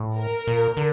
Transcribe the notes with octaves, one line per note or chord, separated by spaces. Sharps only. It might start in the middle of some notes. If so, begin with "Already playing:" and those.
Already playing: A2
A#4
A#2
D3